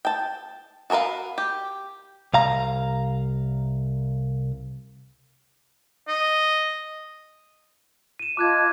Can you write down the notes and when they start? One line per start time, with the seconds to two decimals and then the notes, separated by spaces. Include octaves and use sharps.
0.05 G5 A5
0.90 F#4 G#4 A#4 B4 F5
1.38 G4
2.34 C2 F5 A#5
6.08 D#5
8.19 D#7 E7
8.37 F4 D#5 A5 D6 F#6 G#6